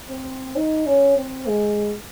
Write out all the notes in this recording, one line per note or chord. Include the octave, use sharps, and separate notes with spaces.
C4
D#4
C#4
C4
G#3